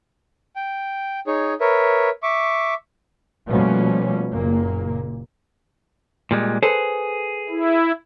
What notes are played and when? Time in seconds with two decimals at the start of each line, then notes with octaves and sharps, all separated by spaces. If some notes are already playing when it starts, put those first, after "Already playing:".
0.56 G5
1.27 D#4 G#4 C#5
1.60 A#4 B4 C#5 E5
2.23 E5 C#6 D6
3.49 B2 F3 G3 A3 A#3 C#4
4.32 F#1 A#2 A#3
6.31 A#2 G3 G#3
6.63 G#4 A4 B4 C5
7.49 E4